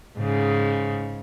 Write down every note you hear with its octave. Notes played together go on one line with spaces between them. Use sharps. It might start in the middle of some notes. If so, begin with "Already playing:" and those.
G#2 C#3